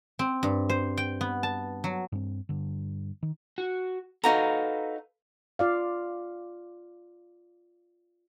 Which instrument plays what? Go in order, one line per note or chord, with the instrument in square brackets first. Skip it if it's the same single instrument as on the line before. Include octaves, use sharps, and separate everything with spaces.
[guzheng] C4
G2
C5
G5
B3
A5
F#3
[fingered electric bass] G2 C4
G2 D3
D#3
[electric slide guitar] F#4
[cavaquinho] D#4 F#4 A#5 [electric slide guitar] A4 B4 F5
[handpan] F4 D5 F5